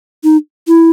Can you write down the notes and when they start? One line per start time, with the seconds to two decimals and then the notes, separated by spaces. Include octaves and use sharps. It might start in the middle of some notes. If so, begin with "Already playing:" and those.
0.24 D#4
0.68 E4